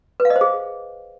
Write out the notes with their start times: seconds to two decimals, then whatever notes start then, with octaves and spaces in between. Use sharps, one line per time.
0.20 B4
0.25 F5
0.30 D#5
0.36 C5
0.41 G#4